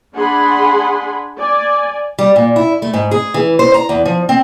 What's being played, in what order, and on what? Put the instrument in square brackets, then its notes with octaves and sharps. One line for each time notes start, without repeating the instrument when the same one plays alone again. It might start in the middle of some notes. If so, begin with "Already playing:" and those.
[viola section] D4 G#4 F#5 G#5 B5 C6
D5 G#5
[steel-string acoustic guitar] G3
A#2
E4
A3
G#2
G#4
E3
C5
A#5
E2
F3
C4